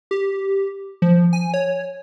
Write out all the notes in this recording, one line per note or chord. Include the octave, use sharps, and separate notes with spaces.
G4
F3
G#5
C#5